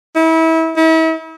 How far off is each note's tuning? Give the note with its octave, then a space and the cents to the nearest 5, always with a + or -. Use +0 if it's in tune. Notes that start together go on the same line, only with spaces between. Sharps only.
E4 -30
E4 -40